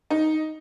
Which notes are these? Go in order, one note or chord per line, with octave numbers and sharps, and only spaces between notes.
D#4